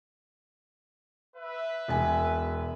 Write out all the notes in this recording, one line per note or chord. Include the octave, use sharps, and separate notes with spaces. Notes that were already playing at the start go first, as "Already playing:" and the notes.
B4 E5
E1 G#5